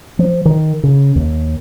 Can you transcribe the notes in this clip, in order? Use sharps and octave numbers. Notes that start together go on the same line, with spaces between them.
F3
D#3
C#3
D#2